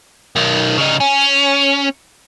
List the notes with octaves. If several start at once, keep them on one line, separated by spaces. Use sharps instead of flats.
B1 D#3
C#3 D#4
C#4